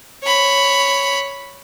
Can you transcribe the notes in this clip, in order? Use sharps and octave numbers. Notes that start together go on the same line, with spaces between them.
C#5 B5